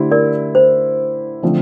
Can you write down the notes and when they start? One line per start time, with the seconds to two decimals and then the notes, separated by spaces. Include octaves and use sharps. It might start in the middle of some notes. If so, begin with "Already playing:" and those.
Already playing: D3 A3 E4 G4 C5
0.11 A#4 D5
0.55 C5
1.43 D3 F3 A3 C4